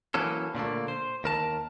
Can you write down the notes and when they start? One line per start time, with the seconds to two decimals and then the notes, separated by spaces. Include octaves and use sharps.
0.14 E3 F#3 A#3 C#4 A4
0.55 A#2 D3 A3 A#3
0.88 C5
1.24 D#2 A#4 A5